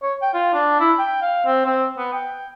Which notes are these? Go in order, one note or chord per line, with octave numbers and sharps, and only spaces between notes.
C#5
G5
F4
D4
E4
G5
F5
C4
C4
B3
G5